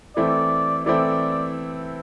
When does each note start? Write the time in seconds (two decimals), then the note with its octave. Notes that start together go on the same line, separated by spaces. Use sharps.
0.16 E3 A3 C4 E4 D5
0.86 E3 A3 C4 E4 D5